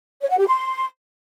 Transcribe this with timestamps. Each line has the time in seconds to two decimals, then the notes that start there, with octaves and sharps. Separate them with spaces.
0.21 C#5
0.30 F#5
0.39 G4
0.47 C6